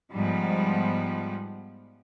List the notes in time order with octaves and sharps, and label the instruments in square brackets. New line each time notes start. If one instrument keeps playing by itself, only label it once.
[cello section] G#2 F3 G3 B3